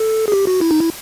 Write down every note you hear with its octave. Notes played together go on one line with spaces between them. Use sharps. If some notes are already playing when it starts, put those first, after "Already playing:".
Already playing: A4
G#4
G4
F#4
E4
D#4
E4